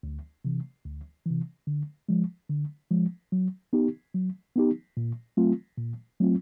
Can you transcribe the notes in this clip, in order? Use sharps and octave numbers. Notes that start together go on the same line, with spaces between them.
D2
C3 E3
D2
C3 E3
D3
F3 G#3
D3
F3 G#3
F#3
B3 D#4 G4
F#3
B3 D#4 G4
A#2
F#3 A3 C4 F4
A#2
F#3 A3 C4 F4